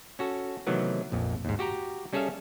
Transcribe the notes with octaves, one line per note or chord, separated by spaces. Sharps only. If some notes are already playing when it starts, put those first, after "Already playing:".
C#4 F#4 A4
C3 D#3 E3 F#3 A3 B3
A#1 F2
D#2 G#2
F#4 G4 G5 A#5
G3 C#4 G#4 A4 E5 F5